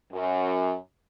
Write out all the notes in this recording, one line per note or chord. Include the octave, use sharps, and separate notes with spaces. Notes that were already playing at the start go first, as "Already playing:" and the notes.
F#2